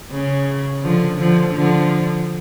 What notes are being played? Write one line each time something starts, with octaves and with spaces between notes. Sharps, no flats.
C#3
D3 F3
D3 F3
D3 F3